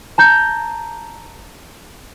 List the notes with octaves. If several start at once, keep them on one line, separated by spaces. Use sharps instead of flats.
A5 A#5 G6